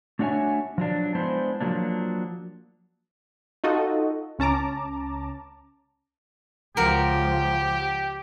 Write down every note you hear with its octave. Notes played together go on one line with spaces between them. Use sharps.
A3 D4 F#4 C#5 E5 G#5
F3 F#3 D4
G#3 B3 D4 E4 C5
F3 F#3 A#3 D4
D#4 F4 F#4 A4 D#5
C#2 C#4 A5 A#5 D6
C#2 F3 F#4 G4 A#4